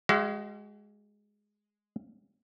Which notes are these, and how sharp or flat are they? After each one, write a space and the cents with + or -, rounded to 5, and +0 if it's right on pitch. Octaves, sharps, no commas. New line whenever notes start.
G#3 +0 F#4 +40 F5 -40